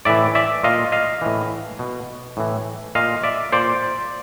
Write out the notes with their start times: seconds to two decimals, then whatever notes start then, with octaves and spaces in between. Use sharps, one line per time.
0.05 A2 E3 D5 E5
0.35 D5 E5
0.63 A#2 D#5 F5
0.92 D#5 F5
1.21 A2 E3
1.79 B2
2.37 A2 E3
2.95 A#2 D#5 F5
3.24 D5 E5
3.52 A#2 C5 D5